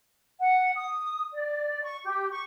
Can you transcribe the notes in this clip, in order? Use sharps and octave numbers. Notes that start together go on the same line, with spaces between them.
F#5
D#6
D5
C#6
G4
C#6